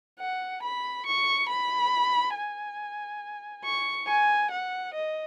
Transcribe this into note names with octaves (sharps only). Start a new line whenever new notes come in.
F#5
B5
C#6
B5
G#5
C#6
G#5
F#5
D#5